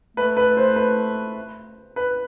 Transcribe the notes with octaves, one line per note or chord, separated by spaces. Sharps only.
A3 B4
B4
C5
B4
B4